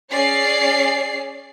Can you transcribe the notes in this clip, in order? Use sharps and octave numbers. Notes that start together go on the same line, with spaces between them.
C#4 G#4 C#5 D5 C7